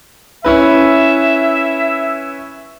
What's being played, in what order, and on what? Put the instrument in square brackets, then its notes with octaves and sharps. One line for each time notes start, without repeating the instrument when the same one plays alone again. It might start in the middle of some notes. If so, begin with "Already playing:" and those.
[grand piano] C#4 E4 B4 [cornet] E5